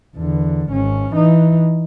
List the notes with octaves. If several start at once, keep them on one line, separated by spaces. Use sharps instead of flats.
E2 D3
G#1 C#4
E3 D#4